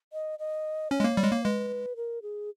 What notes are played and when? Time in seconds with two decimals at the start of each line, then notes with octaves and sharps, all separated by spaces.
0.13 D#5
0.39 D#5
0.91 C#4 C#5
1.00 G#3
1.04 A#3
1.17 G3
1.24 G#3
1.31 A#3
1.44 G#3 B4
1.96 A#4
2.22 G#4